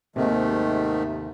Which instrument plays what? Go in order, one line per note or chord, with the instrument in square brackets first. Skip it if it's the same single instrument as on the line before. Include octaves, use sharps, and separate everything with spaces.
[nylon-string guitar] D#2 C3 [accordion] G#2 D#3 A3